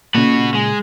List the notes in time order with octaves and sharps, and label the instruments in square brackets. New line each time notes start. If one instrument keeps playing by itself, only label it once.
[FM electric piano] A#2 C#3 [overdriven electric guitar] F#4 B4
[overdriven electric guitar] G#3